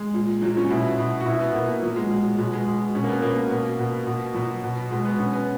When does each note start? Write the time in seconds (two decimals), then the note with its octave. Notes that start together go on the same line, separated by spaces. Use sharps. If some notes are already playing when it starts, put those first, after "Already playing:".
Already playing: G#3
0.14 A#2
0.42 A#2 F#3
0.57 C#4
0.70 B2 E4
0.98 B2
1.21 F#4
1.26 B2 E4
1.40 B3
1.55 B2 A#3
1.83 A#2 F#3
1.96 G#3
2.11 A#2 F#3
2.39 B2 G#3
2.53 G#3
2.67 B2
2.95 B2 C#4
3.04 A#3
3.09 B3
3.22 B2 A#3
3.51 B2
3.79 B2
4.07 B2
4.34 B2 F#3
4.64 B2
4.91 B2 G#3
5.05 B3
5.19 B2 C#4
5.34 B3